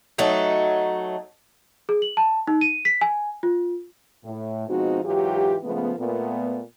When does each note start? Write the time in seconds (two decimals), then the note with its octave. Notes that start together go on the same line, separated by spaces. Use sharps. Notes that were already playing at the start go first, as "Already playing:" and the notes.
0.18 F#3 A3 D#4
1.89 G#4
2.02 F#7
2.17 A5
2.47 D#4
2.61 D#7
2.85 B6
3.01 G#5
3.43 F4
4.25 A2
4.69 B2 F3 G#3 C4 D#4 F#4
5.05 G#2 E3 F#3 F4 G4
5.64 C#3 F3 G#3 A3 B3
5.98 A#2 A3 B3